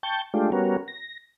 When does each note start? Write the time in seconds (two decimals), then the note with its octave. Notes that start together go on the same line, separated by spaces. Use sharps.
0.03 G5 A5 C#6 G6
0.34 G#3 A3 D4 F4 G4
0.52 G3 B3 C#4 F#4 A#4
0.88 A#6